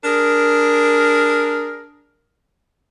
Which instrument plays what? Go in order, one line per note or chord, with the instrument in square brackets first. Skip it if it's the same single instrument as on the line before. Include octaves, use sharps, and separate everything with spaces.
[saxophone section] D4 G#4 A#4